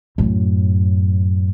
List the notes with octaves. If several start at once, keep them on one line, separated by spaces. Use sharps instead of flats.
F#2 A2